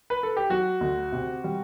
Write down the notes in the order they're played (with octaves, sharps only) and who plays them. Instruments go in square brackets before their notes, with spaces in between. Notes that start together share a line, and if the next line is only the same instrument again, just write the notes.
[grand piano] B4
A4
G4
[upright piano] F#3 [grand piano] F#4
[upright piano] D2
C3
G3